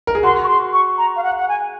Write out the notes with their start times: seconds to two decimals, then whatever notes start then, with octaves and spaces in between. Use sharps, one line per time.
0.07 A#4
0.15 G#4
0.23 F#4 C6
0.43 C#6
0.48 C6
0.73 C#6
0.97 A#5
1.16 F5
1.23 F#5
1.37 F#5
1.48 G#5